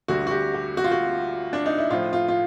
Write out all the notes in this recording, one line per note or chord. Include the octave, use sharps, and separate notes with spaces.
D2 D3 G3 F#4
F#4
G4
G4
F#4
F4
F#4
D4
D#4
E4
A2 F3 F4
F4
F4